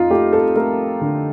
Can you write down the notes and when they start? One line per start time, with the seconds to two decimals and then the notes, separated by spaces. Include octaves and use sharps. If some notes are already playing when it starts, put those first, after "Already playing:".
Already playing: F2 D#4 F4
0.10 A3 G4
0.33 A4
0.56 A3 A#4
1.01 D3